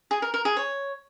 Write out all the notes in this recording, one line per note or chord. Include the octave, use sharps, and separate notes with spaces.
G#4
A#4
A#4
G#4
C#5